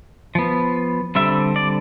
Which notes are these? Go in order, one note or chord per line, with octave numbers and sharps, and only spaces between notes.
F3 B3
D3 G3 C4 E5
D5